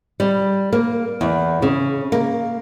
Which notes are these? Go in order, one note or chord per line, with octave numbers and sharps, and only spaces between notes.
G3
A#3
E2
C#3
A#3